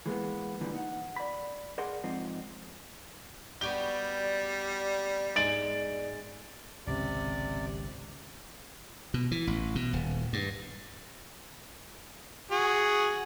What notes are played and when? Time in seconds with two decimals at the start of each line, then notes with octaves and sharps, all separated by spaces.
0.06 E3 G#3 A#3 B3
0.61 A#2 D3 E3 F3 G3 A#3
0.73 D#4 F#5
1.16 D5 B5
1.78 G#4 A#4 D5 F#5 C6
2.03 G#2 F3 C4 D#4
3.61 G3 B3 F#4 G4 D5 G7
5.36 G#2 G#3 A6 D7 F#7
6.87 G#1 C#2 C3 C#4 D5
9.14 B2
9.31 E3
9.47 A1
9.75 B2
9.93 D#1
10.33 G2
12.51 F#4 G#4